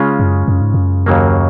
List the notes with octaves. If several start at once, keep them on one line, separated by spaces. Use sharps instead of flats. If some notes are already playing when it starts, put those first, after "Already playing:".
Already playing: C#3 G#3 C#4 F4
F#2
F#2
G#2
F#2
D#2 C#3 F#3 A#3